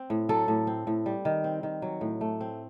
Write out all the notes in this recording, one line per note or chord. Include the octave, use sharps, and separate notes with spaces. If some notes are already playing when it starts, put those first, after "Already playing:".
Already playing: C4
A2
F#3 A4
A2
C4
A2
G3
D#3
C4
D#3
F#3
A2
A3
C4